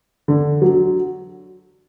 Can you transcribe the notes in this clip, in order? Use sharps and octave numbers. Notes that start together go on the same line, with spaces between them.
D3
F#3